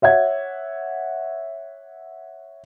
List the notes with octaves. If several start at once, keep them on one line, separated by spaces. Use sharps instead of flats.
C#5 E5 F#5 G#6